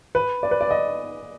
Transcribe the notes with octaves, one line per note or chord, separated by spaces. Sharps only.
B4
D5
B4
D5
D#5